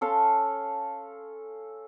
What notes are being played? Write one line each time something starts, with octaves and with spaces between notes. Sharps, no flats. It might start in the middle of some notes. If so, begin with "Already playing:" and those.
C#4 A4 F5 C6